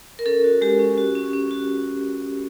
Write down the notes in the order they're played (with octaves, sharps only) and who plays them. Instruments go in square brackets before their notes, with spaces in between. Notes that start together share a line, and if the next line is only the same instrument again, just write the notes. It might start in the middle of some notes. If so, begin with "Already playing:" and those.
[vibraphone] A#4
C#4 A4
F#4
G#3 G4
C#4
F#4
C#4
C#4
F#4